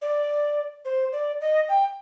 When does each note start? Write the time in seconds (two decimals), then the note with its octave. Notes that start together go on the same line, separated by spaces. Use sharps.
0.01 D5
0.85 C5
1.12 D5
1.41 D#5
1.69 G5